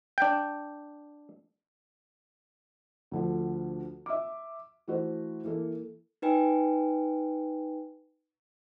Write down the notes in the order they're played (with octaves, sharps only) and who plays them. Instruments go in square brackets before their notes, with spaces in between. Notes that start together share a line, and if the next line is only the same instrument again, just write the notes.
[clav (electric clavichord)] D4 G5
[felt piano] D2 D3 F3
E5 D6
E3 A3 F#4 C5
E3 A#3 A4
[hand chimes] D#4 B4 G5 G#5